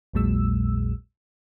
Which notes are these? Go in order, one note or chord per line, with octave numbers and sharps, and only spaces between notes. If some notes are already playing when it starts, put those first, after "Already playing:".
A#1 E2 A#2 F#3 G#3 E6